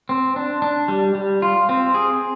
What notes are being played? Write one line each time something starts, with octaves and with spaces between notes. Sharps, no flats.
C4
D4
D4
G3
G3
F4
C4
G#4